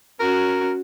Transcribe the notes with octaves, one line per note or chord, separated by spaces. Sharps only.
C#4 F#4 A#4